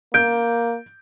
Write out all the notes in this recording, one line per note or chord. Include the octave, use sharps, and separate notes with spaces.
A#3 G6 D7